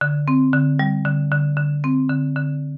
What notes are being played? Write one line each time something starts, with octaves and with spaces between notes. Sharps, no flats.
D3
C4
D3
G3
D3
D3
D3
C4
D3
D3